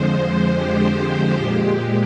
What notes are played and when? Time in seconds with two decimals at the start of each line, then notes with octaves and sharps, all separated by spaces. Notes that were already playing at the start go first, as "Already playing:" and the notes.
Already playing: F2 D3 F3 G#3 C5
0.56 G4
1.38 A#2 G#3 G4